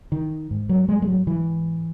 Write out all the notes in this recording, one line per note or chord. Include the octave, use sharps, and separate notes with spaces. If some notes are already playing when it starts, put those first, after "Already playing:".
D#3
G#2
F#3
G#3
G#3
F#3
E3